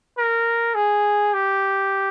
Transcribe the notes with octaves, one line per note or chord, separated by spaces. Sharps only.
A#4
G#4
G4